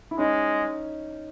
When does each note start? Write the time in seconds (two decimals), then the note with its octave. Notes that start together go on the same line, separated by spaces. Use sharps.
0.11 E4
0.18 G#3 C#4 D#4